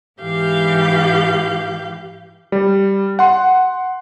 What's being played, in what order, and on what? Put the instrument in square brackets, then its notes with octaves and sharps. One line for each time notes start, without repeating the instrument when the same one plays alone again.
[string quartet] G#2 E3 G4 F5 G6
[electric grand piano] G3
F#5 C6